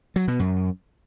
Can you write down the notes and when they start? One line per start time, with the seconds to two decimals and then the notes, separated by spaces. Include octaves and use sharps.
0.16 F#3
0.28 B2
0.40 F#2